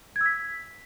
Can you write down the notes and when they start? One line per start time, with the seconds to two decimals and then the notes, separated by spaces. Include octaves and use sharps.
0.16 G#6
0.21 E6
0.26 B6